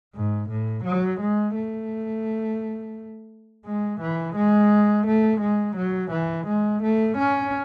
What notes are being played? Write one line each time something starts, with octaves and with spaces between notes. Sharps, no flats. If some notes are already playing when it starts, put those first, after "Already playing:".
G#2
A2
F#3
G#3
A3
G#3
E3
G#3
A3
G#3
F#3
E3
G#3
A3
C#4